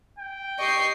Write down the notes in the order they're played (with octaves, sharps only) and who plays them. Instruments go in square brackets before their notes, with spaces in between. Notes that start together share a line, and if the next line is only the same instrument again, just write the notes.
[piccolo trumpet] G5
[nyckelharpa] G4 C#6 [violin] D#5 C7